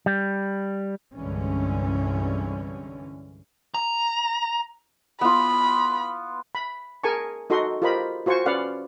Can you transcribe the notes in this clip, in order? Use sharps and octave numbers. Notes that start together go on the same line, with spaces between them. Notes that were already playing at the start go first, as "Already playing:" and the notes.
G3
C2 G2 D3 E3 G#3 C#4
A#5
B3 F4 B5
B5
G#4 A#4 G#5 A5 C#6
D#4 F#4 A4 D#5 C6
F4 G4 A#4 C5 D#5 B5
F4 F#4 C5 G#5 C#6
C#4 B4 D5 F5 F#5